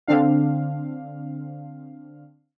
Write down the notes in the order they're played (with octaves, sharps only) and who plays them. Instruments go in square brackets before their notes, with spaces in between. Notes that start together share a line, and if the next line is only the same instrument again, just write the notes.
[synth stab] D3 C4 D4 F5